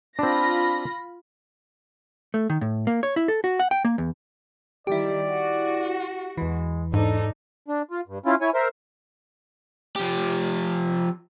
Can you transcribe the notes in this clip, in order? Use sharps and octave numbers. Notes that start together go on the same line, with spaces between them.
C4 D4 F4 B5 A#6
A3
D#3
A2
A#3
C#5
E4
A4
F#4
F#5
G5
A#3
E2
D#3 G3 E4 G4 D5
F#4
E2 E3 G#3
G#2 D4 D#4 A4 C5
D4
F4
G2
C#4 E4 F4
E4 C#5 G#5
A#4 C5 E5
F3 G4